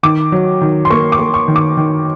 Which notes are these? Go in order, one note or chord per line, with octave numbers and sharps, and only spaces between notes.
D#3 D6
F#3
D#3
C6
A#3 C#6
D6
A#3
C#6
D#3
D6
D#3